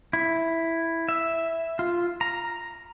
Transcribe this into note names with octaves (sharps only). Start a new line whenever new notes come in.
E4
E5
F4
A#5